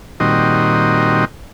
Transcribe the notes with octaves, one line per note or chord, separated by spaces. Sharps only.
A#2 D#3 G3 C4 F#4 D#5